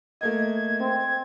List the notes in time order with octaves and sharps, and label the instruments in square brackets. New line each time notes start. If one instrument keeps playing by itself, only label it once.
[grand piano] A3 A#3 D#5 [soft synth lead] G#6
[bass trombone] C4